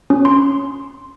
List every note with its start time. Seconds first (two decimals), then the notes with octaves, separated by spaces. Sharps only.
0.10 C#4
0.25 C6